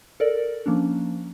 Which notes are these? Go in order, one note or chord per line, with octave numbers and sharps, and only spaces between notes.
A4 A#4 D5
F3 A#3 C#4 D4